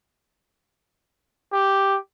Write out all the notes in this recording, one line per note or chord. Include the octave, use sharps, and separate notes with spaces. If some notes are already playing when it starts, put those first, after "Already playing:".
G4